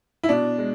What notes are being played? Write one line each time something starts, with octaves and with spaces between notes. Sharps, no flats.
E4
B2 D4
G#3